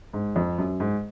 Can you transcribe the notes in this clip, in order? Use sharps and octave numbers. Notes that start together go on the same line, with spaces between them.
G#2
F2
F#2
G#2